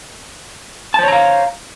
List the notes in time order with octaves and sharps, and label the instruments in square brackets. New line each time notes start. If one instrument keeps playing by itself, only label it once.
[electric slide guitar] A5
C5
C#5
A#5
F5